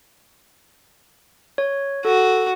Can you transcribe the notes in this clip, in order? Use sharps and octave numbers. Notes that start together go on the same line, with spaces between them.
C#5
F#4 A4